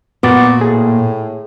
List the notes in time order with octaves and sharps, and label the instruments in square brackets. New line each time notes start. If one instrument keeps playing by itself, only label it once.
[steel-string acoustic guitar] A#2 [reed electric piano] B3 D6 A6 [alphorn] F#4
[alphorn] A2 [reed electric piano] G#4